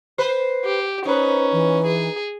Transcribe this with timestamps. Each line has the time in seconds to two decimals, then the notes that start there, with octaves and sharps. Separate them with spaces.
0.18 B4 C5
0.65 G4
1.05 C#4 D#4 B4 C5
1.52 E3
1.86 G#4